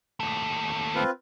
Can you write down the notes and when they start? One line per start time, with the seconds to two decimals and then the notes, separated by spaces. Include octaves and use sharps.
0.20 D#2 A3
0.95 C4 F4 B4